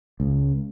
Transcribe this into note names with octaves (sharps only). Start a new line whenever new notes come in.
C#2